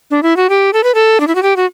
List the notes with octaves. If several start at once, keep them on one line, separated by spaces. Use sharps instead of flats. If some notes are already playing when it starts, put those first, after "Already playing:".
D4
E4
F#4
G4
A4
B4
A4
D4
E4
F#4
G4
F#4